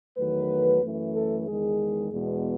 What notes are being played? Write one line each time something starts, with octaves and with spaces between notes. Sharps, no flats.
E2 D#3 F#3 A3 B4
F#2 E3 A3
A4
E2 D#3 G#3 G#4
E2 B2 G#3